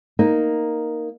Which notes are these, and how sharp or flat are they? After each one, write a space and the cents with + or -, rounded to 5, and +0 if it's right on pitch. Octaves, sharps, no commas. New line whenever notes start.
A#3 +0 D#4 +0